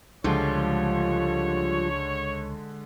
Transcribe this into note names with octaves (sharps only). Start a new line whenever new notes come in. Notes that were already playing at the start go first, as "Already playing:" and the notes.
C#2 D3 F3 G3 G#3 F4 C#5